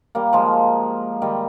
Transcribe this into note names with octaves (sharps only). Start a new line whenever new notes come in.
G3 A#3
F3 G#3
D#3 G3